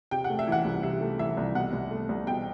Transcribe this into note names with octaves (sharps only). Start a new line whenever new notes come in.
C3 G5
F#5
A3
E5
E3 F#5
C2
C3 E5
A3
E3 E5
C2
B2 F#5
C2
A3
C2
B2 G5